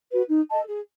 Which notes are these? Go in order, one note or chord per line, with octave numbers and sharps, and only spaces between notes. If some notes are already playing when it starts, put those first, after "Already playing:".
F#4 B4
D#4
A4 D#5 A5
G#4